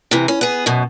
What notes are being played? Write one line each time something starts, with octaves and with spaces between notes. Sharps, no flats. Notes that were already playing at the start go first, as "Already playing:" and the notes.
C3 E3
C#4
B3 G#4
F#2 B2